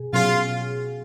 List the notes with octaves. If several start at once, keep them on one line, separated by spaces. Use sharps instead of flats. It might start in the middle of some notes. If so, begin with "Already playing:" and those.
Already playing: B2 G#4
B2 F#3 C#4 F4 G#4